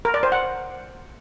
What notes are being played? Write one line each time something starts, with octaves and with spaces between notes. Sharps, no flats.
A#4
D5
C5
F#5